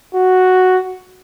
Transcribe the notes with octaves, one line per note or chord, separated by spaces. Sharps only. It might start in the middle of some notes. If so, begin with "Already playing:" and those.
F#4